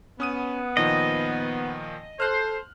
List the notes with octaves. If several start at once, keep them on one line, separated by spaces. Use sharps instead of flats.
B3 C#4 D#6 D#7
A#2 D#3 F3 D#5
A4 C5 F6 F#6